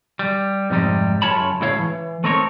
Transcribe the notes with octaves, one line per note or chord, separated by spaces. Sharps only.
G3
F2 G#2 C3 G3 D#4
F#2 C#3 F4 C#5 A5 B5
C#2 A2 C#3 E4 C#5 F5
E3
A3 C4 D#4 A#4 C5 C#5